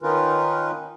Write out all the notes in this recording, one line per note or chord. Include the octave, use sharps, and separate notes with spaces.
D#3 C#4 D#4 F4 A#4 B4